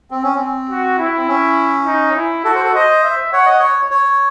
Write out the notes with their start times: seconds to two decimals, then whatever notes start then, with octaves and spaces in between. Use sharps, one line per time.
0.11 C4
0.23 C#4
0.35 C4
0.69 F#4
0.99 E4
1.17 C4
1.28 C#4
1.86 D#4
2.16 E4
2.45 F#4 A4
2.55 C5
2.64 A4
2.74 C5 D#5
3.04 E5
3.33 C#5 F#5
3.46 D#5
3.59 C#5
3.91 C#5